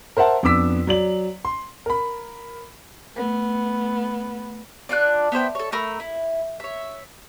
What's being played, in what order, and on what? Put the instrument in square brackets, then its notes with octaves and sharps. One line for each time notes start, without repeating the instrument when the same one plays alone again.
[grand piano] A#4 C5 E5 F#5 A5
F2 B3 D4 D6 E6 B6
F#3 D5 F#7
C6
A#4 B5
[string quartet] A3 B3
[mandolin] D4 F4 D5 F#6
B3 E4 C5 G5
A4 C#5
A3 A#4 B5 E6
E4
C#5 E5